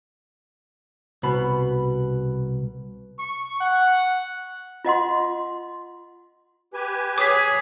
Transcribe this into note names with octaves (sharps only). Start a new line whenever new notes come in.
C2 B2 B5
C#6
F#5
F4 D#5 F#5 C6
G4 B4 G#5
G#4 C#5 D6 B6